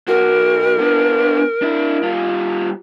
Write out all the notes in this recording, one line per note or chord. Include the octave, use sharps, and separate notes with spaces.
B1 F#4 A#4
B3 D4
D4 E4
G3 F4